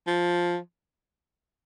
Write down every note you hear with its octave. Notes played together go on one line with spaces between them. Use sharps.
F3